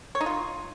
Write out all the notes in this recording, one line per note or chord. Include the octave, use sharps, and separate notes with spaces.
C#5
D#4
F4